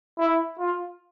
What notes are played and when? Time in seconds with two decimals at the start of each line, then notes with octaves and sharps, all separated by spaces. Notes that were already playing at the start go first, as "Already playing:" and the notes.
0.18 E4
0.59 F4